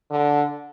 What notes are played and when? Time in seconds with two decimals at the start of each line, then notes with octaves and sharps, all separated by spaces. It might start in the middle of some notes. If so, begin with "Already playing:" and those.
0.10 D3